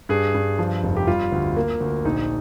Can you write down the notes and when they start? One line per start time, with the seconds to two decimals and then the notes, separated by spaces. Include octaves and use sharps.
0.09 G2 G#4
0.34 G2
0.59 F3
0.83 F1
0.97 G4
1.07 G3 F4
1.32 D2
1.56 A#3
1.80 D2
2.05 A#1 D#4